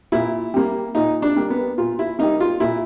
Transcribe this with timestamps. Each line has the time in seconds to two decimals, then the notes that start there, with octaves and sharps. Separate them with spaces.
0.12 A#2 E4
0.54 G3 A#3
0.95 A#2 D#4
1.22 D4
1.36 G3 A#3
1.50 B3
1.78 A#2 F4
1.99 E4
2.19 G3 A#3 D#4
2.40 F4
2.60 A#2 E4